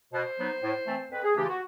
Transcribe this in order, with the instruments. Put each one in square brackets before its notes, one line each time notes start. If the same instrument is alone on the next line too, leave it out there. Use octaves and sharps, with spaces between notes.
[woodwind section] B2 C5
F#3 B3 D#4
A2
E3 A3 C4
F2 B4
G#4
C#3 E3 A3 D4 G4
F4
F#4